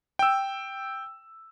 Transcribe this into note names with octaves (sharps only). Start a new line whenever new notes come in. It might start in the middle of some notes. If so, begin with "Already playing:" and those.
G5 E6